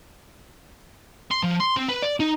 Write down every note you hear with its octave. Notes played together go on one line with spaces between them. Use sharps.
C6
F3
C6
C4
B4
D5
D#4